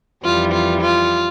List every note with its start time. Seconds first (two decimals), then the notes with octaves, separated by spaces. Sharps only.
0.23 F2 E3 G3 F4
0.52 F4
0.81 F4